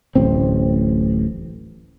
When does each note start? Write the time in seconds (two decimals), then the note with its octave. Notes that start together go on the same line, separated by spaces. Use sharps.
0.15 D1 A1 C4